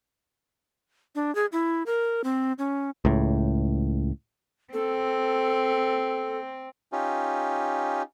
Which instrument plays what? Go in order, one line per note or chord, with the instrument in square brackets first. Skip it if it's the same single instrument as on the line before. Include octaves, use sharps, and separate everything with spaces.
[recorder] D4
G#4
E4
A#4
C4
C#4
[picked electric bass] C#2 A2
[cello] C4 [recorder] A4
[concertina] C#4 D#4 F4 G4